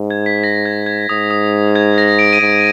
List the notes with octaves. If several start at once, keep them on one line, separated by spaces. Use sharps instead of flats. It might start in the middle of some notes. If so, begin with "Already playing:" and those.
Already playing: G#2
G#6
B6
A#6
G#6
G#6
G#2 D#6
D#6
G#6
A#6
D7
D#7
G#2 D7